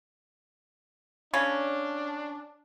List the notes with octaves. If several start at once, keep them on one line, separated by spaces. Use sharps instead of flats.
C#3 C#4 D4